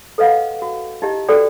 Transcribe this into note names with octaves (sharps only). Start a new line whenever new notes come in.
A4 B4 D#5 F5 F#5
F#4
D#4 E4 G4 D#5
F#4 A4 B4 D5 G5